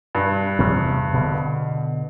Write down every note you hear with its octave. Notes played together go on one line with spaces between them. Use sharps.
G2
E2 C3 B3
B2 D3